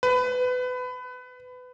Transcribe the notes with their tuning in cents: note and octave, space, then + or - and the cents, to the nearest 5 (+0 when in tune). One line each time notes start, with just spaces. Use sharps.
B4 +25